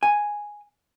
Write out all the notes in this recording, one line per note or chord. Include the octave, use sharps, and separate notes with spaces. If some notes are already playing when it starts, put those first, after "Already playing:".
G#5